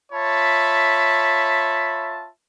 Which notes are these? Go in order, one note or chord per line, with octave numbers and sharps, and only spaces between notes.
F4 C#5 E5 A5 B5